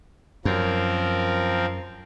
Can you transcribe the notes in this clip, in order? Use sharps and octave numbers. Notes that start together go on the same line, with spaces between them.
F#2 F3 C4 A#4